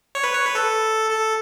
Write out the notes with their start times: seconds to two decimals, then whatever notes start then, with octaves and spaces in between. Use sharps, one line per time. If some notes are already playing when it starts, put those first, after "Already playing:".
0.15 C#5
0.24 B4
0.34 C#5
0.45 B4
0.55 A4
1.10 A4